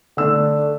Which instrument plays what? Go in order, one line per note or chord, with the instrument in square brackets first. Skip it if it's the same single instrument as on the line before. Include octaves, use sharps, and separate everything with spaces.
[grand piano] D3 A3 D4 E6